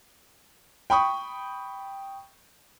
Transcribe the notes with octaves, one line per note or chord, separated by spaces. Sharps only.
G5 B5 C#6 D#6